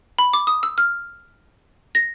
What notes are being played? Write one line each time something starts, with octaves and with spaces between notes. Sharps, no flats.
B5
D6
D#6
E6
F6
A#6